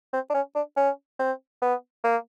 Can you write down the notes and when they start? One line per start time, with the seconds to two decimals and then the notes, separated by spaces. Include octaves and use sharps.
0.13 C4
0.30 D4
0.34 C#4
0.55 D4
0.77 C#4
1.19 C4
1.61 B3
2.04 A#3